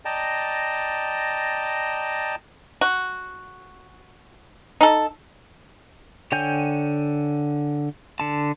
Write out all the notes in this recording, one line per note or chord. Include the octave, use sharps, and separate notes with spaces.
D5 D#5 G5 A5 A#5
F#4
D#4 A4
D3 C#5 G5 G#5 G6
D3 A5